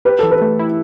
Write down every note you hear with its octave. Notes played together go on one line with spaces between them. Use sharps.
G4 B4
E3 A4
B4
A3
E4